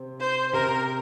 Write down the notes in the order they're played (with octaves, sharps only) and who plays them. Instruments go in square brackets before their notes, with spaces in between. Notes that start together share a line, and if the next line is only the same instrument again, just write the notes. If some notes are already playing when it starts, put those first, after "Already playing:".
Already playing: [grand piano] C3 C4
[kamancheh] C5
[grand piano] C3 C4 [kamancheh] A#4